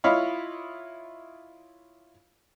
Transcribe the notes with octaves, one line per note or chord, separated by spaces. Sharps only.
E4 F4 C#5 D#5 F5 B5